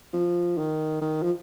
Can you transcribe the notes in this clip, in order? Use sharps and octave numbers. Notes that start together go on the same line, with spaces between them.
F3
D#3
D#3
F3